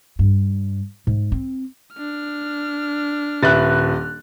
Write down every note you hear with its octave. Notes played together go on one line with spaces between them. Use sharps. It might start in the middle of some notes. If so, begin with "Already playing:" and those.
G2
G#2
C4
D4 F6
D#1 B4 E5 F#6 A6